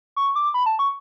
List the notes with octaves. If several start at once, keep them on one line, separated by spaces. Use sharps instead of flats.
C#6
D6
B5
A5
C#6